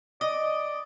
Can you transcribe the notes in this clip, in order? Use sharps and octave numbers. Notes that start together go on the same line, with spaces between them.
D5 D#5